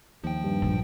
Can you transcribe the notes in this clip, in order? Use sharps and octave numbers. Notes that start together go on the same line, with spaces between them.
D#2 F3 G5
G2
A#1